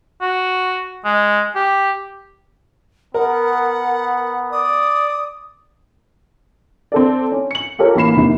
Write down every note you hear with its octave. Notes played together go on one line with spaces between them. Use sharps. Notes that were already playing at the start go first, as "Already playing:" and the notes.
F#4
G#3
G4
B3 A#4 F#5
D5 D#6
C4 A4 D5
C#4
C#7 F#7
F4 G4 A4 A#4 C#5
A1 A#3 B5 C7 E7
F1 D#2 C3 D#3